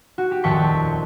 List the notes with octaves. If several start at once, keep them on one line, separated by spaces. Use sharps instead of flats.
F#4
G4
D#1 F2 G5 A5 C#6 B6